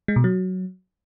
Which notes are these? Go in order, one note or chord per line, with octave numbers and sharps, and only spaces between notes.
G#3
B2
F#3